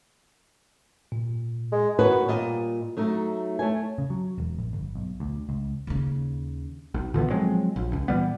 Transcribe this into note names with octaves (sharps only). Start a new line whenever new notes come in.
A#2
G#3
B2 D#3 B3 F#4 B4 C#5
A#2 G3 D#5
F#3 A3 D#4
A3 C#5 G#5
C#3
F#3
E1
A#1
G1
B1
D2
C#2
D#2 C#3
B1
A#2 D3 E3 B3
F3 F#3 G#3 C4
A#1
C#2
A#2 E3 G3 B3